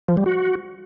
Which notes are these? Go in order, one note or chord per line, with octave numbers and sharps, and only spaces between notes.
F3
G3
F#4